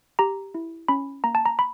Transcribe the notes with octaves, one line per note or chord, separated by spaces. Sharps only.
G4 A#5
E4
C#4 B5
A#3 A#5
A5
A#5
B5